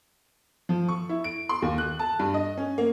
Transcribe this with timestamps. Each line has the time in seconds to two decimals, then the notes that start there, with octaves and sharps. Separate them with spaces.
0.69 F3
0.88 C#6
1.09 E4
1.24 D7
1.49 C6
1.62 D#2
1.78 F#6
1.99 A5
2.19 G2
2.34 D#5
2.57 C#4
2.78 A#3